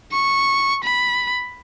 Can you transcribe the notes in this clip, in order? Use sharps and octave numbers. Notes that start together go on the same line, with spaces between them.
C#6
B5